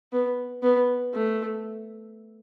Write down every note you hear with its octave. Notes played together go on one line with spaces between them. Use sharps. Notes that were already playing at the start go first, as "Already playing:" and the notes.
B3
B3
A3